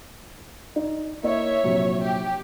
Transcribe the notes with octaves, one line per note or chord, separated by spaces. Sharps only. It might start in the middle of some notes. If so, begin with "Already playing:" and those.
D#4 D5
A#3 E4 C#5 D#5 E5
A#1 C3 F#3
G4